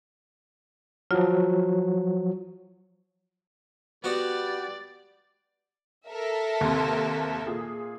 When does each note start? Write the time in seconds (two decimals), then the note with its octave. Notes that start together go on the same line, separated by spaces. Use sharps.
1.11 F3 F#3 F4
4.04 B3 F#4 G4 B4 D5 F#5
6.08 A4 A#4 E5
6.61 D#2 C3 C6
7.47 A#2 G#4